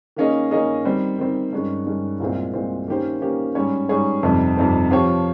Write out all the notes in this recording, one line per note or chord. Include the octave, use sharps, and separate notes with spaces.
D#3 A#3 C#4 G#4 D#5
D#3 A#3 C#4 G#4 D#5
D#3 G3 C4
D#3 G3 C4
G2 D#3 G#3 C#4
G2 D#3 G#3 C#4
C2 A#2 G#3 C4
C2 A#2 G#3 C4
D#3 A#3 C#4 G4 C5
D#3 A#3 C#4 G4 C5
G#2 G3 C#4 G#4 C#5
G#2 G3 C#4 G#4 C#5
F2 C3 G3 C4 D#4
F2 C3 G3 C4 D#4
F3 C4 G4 C#5